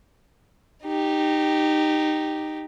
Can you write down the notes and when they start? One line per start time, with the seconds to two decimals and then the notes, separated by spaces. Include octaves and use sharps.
0.84 D#4 G4